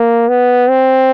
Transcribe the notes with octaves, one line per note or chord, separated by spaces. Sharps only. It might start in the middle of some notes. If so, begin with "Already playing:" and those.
Already playing: A#3
B3
C4